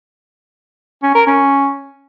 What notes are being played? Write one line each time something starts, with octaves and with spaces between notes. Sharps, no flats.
C#4
A#4
C#4